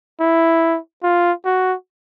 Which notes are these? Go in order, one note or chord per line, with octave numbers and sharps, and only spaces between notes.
E4
F4
F#4